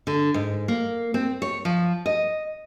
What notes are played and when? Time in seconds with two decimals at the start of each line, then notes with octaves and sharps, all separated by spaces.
0.07 D3
0.34 G#2
0.68 A#3
1.14 C4
1.42 C#5
1.65 F3
2.06 D#5